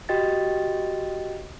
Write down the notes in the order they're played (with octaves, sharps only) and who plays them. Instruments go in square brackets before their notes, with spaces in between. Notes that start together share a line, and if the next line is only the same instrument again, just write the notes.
[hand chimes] F#4 G4 D#5 G5 A6